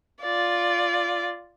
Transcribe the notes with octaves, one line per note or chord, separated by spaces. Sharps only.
F4 D5